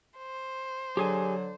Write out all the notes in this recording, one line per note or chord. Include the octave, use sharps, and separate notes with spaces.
C5
D3 F#3 G4 G#4 G#5